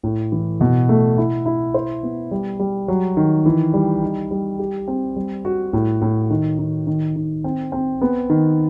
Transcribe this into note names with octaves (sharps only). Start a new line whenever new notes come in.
A2
E3
B2
A3
E4
E4
C5
B3
G3
G3
F#3
D#3
E3
G3
D#4
G3
G4
C4
G3
F#4
A2
A2
D#3
D#3
D#3
D#3
C4
C4
B3
D#3